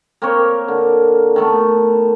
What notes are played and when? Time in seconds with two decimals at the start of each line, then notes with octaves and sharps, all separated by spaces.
0.22 A#3 C4 A#4 C#5
0.68 D3
1.36 D#3 A3 B3